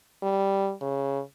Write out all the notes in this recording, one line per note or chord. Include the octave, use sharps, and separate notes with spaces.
G3
C#3